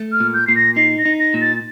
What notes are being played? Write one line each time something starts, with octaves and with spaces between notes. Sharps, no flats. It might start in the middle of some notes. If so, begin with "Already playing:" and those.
Already playing: A3
F6
A#2
G6
A#2 C7
A#6
D#4 C7
A#6
D#4
A#6
A#2
A6